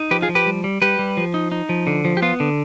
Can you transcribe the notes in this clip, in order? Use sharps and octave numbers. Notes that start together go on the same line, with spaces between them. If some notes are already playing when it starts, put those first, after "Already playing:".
Already playing: D#4
F3 G4 B4
F4 G#4
F3
G4 B4
G3
G3
G3 G4 B4
G3
F3
D#4
D#4
F3
D3
F3
G4
B3 F4
D3